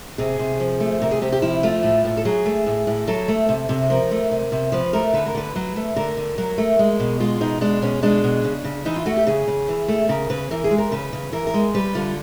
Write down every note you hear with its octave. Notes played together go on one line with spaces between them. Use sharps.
C3 G#4
C3
F3
A3
C3 A#4
G#4
C3 G4
G4
F3 E4
A3 F4
A2
A2
A4
F#3 G#4
A3
A2
A2
F#3 A4
A3
C3
C3
F3 A#4
A3
C3
C3
F3 B4
A3 A#4
D3 B4
A#4
D3 B4
F#3
A3
D3 A#4
D3
F#3 A#4
A3
G#3
B2
G#3 F4
B2 D#4
G#3 D4
B2 C#4
G#3 D4
B2
C#3
C#3
E3 D#4
F4
A3 F#4
G4
C#3 G#4
C#3
E3
A3
C#3 A#4
C#3 B4
E3 A#4
G#4
G#3
A#4
C#3 B4
C#3
E3 A#4
A#4
G#3
G3 B4
D3 F4